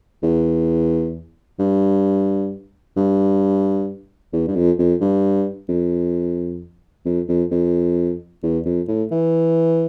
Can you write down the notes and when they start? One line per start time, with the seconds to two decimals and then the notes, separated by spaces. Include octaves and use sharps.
0.23 E2
1.59 G2
2.97 G2
4.33 E2
4.48 G2
4.56 F2
4.79 F2
5.01 G2
5.69 F2
7.06 F2
7.29 F2
7.52 F2
8.43 E2
8.66 F2
8.88 A2
9.11 E3